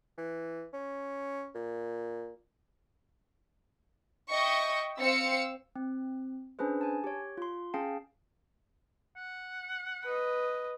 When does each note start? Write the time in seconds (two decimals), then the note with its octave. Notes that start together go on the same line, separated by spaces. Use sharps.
0.18 E3
0.73 C#4
1.55 A#2
4.30 D#5 E5 G5 C#6
5.01 C4 C5 F5 E6 C#7
5.76 C4
6.59 C#4 D4 G#4 B4 C5
6.81 G#5 A5
7.04 G4 C#5
7.37 F4 C6
7.74 C#4 G#4 F5 G5 A5
9.17 F#5
10.04 B4 D#5